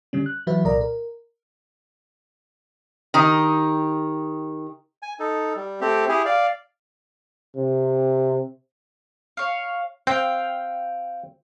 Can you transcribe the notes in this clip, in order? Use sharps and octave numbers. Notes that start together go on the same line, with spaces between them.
D3 G3 C#4
F#6
E3 F#3 F#4 B4 E5
C2 A#2 A#4 D5 A#5
A#4
D#3 D#4 G4
G#5
D#4 A4
G3
A3 C4 G4
E4 G4 G#4
D5 F5
C3
C#5 F5
C4 F5 G5